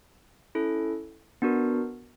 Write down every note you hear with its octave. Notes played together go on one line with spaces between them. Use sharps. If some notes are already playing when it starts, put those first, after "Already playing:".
C#4 E4 A4
B3 D4 F#4 A#4